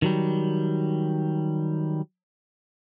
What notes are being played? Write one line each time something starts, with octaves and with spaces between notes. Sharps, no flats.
D#3 F#3 G3